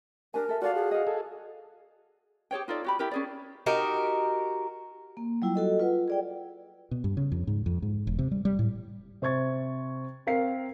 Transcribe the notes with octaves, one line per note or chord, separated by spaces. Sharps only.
D4 G4 A#4 G#5
A4 E5
F4 F#4 A4 D5 F5
G#4
D#5 F5
G#4 A4
G4 G#4 C#5 G5
D#4 F4 A4 D5
F#4 G4 B5
E4 G4 A#4
C#4 G#4 D5
D#4 F#4 G4 A#4
A#3
F#3 G3 E4 F4 G5
F#4 A4 D#5
F4 B4 F#5
G#4 D5 G5
B2
G2
C#3
F2
G#2
F2
G#2
E1
C3
G3
G3
A2
C3 C5 C#6 G#6 A6
C4 A#4 F5 C7